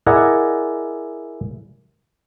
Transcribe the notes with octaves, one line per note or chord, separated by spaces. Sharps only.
E4 G#4 A#4 D5 D#5 F#5